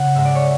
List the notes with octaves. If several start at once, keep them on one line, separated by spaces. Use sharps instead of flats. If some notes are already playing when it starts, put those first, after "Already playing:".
Already playing: C#3 F#5
G#2 G#3 E5
D5
C#5